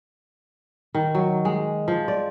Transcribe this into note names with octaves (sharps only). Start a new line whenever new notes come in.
D#3
F#3
G#3
F3
D5